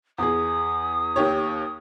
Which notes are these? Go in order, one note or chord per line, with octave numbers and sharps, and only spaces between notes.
E2 G#4 D#6
D#2 G4 C#5